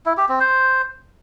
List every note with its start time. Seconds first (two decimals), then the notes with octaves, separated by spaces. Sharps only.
0.06 E4
0.17 G4
0.29 C4
0.40 C5